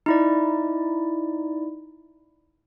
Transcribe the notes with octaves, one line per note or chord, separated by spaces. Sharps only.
D#4 E4 D5